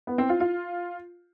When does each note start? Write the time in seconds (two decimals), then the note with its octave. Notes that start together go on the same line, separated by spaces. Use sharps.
0.07 B3
0.18 C4
0.29 F4
0.40 F4